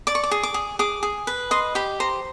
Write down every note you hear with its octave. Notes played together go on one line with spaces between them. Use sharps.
D5 D6
C#6
D6
G#4
D6
G#4
G#4 D6
G#4
B4
D#5 C6
G4 B5
C5 A#5